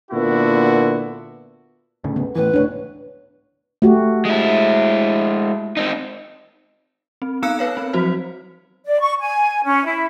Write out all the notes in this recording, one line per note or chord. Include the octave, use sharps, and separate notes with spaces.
A#2 D3 B3 E4 F#4
D2 A2 C#3
B3
A2 E3 B4
C#2 A2 D4 C#5
A3 F#4 G4
G#3 E4
C4 D#4
C4
B3 D#4 F5 E6 F#6 C#7
B4 C#5 F5
C4
F3 F#3 F#4 C5
D5
C#6
G#5
C#4
E4